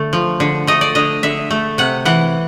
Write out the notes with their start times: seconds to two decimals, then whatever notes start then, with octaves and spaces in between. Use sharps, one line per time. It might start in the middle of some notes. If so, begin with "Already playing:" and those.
Already playing: D3 A3
0.13 F3
0.40 D3
0.67 A3 D#5
0.81 D5
0.95 D3 D#5
1.23 D3 E5
1.51 A3
1.78 C3 F#5
2.05 E3 F#5